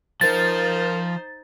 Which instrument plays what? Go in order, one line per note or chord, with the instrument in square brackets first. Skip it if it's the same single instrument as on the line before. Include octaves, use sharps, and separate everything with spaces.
[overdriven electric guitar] F3 F4 [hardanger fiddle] D#4 C5 [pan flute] A#4 [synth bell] A6